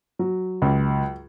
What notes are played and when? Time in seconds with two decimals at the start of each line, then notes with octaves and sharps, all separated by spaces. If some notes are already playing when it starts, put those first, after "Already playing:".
0.19 F#3
0.62 C#2